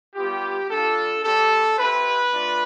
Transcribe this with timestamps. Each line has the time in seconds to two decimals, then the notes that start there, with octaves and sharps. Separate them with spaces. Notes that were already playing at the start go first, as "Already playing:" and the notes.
0.15 G3 B3 F4 G4
0.69 G3 D4 F4 A4
1.23 G3 C4 G4 A4
1.78 C4 E4 G4 B4
2.33 A3 D4 F4